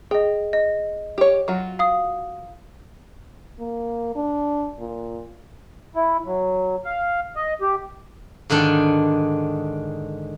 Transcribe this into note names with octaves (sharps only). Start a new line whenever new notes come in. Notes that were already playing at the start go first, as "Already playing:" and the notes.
G#4 D#5 G5
D#5
G4 C#5
F#3 F4 F#4
F5 D#6
A#3
D4
A#2
E4
F#3
F5
D#5
G4
G#2 D3 D#3 D4 G5